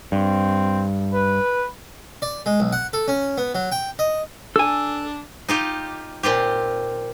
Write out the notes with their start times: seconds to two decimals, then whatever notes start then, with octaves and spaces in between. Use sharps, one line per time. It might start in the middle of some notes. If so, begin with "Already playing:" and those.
0.12 G2 C4
1.14 B4
2.22 D5
2.46 G#3
2.60 B1
2.73 F#5
2.93 A4
3.08 C#4
3.38 B3
3.55 F#3
3.72 G5
3.99 D#5
4.56 D4 A4 G#5 E6
5.48 D#4 F4 G4
6.23 A#2 C4 F4 G4